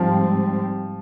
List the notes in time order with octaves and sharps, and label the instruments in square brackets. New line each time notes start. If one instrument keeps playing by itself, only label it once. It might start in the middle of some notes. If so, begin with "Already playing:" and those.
Already playing: [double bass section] G#2 G3 C4 [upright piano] F3